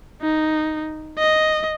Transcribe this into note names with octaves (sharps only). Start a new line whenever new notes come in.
D#4
D#5